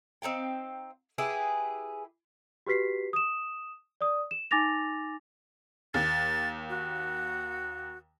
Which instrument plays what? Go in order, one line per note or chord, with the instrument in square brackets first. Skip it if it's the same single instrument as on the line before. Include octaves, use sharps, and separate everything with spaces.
[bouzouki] C4 D#4 F5 G5
E4 G4 G#4 B4
[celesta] F#4 G4 B4 B6 C7
D#6 E7
D5 D#6
E7
D#4 G#5 D6 A6 A#6 F7
[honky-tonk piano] D#2 [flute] A6
[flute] F#4